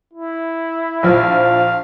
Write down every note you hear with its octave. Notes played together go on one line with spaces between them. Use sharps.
E4
A#1 F3 F5